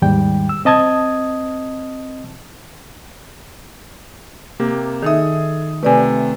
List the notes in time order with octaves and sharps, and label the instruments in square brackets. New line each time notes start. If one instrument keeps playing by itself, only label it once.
[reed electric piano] D#2 G#2 G3 G5
E6
C4 D#5 A5 D#6 G#6
[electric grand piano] C3 A#3 G4
[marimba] D#3 D#4 E5 [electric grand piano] G#4 A4 D#6
[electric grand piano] C3 A3 [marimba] B4 D5 G#5